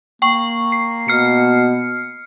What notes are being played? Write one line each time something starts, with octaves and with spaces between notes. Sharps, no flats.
A#3 G5 C#6
C7
B2 F6 C7 C#7